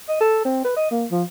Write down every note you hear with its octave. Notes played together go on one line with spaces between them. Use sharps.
D#5
A4
C4
B4
D#5
A#3
F3